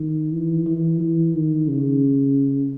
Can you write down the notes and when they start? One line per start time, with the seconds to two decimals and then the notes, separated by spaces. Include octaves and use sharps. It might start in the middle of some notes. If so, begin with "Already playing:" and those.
Already playing: D#3
0.32 E3
0.66 E3
1.00 E3
1.35 D#3
1.68 C#3